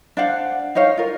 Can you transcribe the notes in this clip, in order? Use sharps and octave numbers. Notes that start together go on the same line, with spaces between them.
D4 C5 F5 F#5
D#4 C5 C#5 F5
F4 A#4